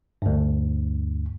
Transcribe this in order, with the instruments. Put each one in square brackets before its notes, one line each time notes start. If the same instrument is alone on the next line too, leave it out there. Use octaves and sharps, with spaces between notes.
[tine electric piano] D2 G2